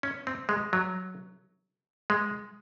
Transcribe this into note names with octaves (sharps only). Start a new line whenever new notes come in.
C#4
C4
G#3
F#3
G#3